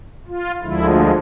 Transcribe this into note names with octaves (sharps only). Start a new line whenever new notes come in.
F4
D2 D3 F3 G#3 E4